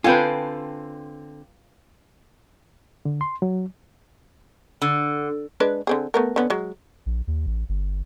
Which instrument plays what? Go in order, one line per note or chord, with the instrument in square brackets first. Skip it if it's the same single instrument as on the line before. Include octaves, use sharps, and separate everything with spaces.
[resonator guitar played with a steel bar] D3 C4 A4 [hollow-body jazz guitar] F4 [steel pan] B4 G5 G#5
[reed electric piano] D3
C6
F#3
[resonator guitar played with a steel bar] D3
[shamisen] G#3 D4 B4
D3 C4 G#4
A3 B3 A#4
D3 B3 C#4
F#3 G#3
[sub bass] A#1
D#2
A1
G1